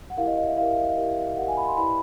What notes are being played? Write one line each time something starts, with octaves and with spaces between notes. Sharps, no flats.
F#5
E4 G4 A#4 F5
D#5
D#5
E5
E4 G4 A#4 F5
E4 G4 A#4
E4 G4 A#4 F#5
G#5
B5
C6
E4 G4 B4 D5 B5